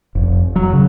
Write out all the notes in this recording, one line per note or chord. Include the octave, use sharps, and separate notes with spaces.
F1
F#3
C#3